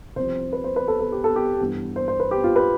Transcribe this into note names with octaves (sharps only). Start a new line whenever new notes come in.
C2 C3 F3 C5
B4
C5
B4
A4
A4
G4
A4
G4
G2 E3 B3
C5
C5
B4
G4
F4
B4